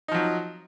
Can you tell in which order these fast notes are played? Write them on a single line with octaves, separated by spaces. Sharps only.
D#4 F3 F#3